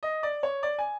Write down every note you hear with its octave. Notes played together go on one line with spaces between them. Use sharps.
D#5
D5
C#5
D5
G#5